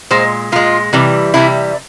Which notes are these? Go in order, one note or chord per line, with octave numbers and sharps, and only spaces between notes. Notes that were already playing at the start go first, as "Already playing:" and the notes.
A#2 G#3 C5
A#2 G#3 F4
C3 E3 G3
C3 E3 G3 E4